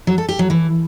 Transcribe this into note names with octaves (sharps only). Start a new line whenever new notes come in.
F#3
A4
G4
F#3
E3